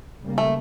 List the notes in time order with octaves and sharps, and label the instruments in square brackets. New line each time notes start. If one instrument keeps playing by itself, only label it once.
[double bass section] C#3 G3 A#3
[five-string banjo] A3